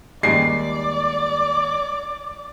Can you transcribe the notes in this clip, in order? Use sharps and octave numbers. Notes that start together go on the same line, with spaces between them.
D#2 G3 G#3 D5 D6 C7